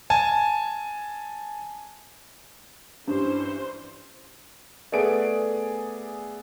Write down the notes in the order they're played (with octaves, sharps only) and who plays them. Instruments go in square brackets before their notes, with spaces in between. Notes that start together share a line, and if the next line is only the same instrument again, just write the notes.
[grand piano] G#5 A5
[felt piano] G2 [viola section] E3 C#4 C5
[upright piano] A3 B3 G#4 D5 D7